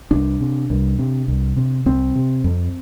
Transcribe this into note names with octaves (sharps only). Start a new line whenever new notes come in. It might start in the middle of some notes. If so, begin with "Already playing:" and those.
C2 D4
C3
C2
C3
C2
C3
C2 C4
C3
F2